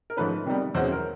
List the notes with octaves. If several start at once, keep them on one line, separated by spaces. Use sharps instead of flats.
A#4
G#2 F3 A3 C#4 B4
C3 D#3 G3 B3
E2 B2 G#3 C#4 C5
A#4